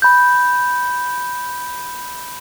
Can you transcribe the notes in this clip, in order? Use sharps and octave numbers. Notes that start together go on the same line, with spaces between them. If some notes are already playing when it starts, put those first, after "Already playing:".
B5 G6